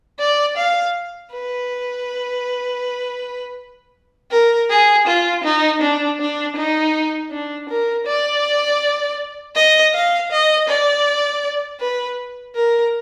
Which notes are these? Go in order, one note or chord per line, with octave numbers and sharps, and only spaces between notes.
D5
F5
B4
A#4
G#4
F4
D#4
D4
D4
D#4
D4
A#4
D5
D#5
F5
D#5
D5
B4
A#4